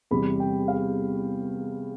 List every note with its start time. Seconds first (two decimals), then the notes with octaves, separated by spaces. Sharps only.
0.11 E2 C3 G3 B5
0.40 G5
0.68 F5